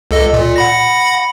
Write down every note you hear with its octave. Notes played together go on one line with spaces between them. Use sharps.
C#2 A4 D#5
A#2
F#5 B5 A#6